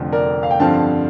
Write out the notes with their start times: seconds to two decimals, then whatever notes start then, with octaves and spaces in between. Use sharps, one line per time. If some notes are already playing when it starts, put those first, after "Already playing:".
Already playing: F1 F2 D3 F3 A3
0.12 A#4 D5
0.43 F5
0.51 G5
0.60 G2 D3 F3 C4 F5 A5